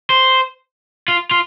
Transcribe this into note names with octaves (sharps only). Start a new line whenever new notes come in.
C5
F4
F4